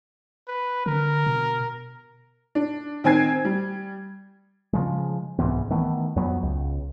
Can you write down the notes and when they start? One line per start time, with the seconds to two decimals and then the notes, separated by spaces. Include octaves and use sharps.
0.48 B4
0.86 D3 A#4
1.26 B2
2.55 D4
3.04 D#3 C4 G#5 G#6 C7
3.45 G3
4.73 C#3 F3 G#3
5.39 C2 G#2 E3 B3
5.70 D#3 E3 A3 B3
6.16 F2 F#3 B3
6.43 C#2